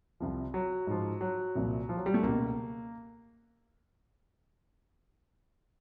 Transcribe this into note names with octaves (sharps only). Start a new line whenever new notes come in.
C2 C3 F3
F#3
G#2 F3
F#3
C2 A#2 F3
F3
F#3
G3
A3
C#2 B2 A#3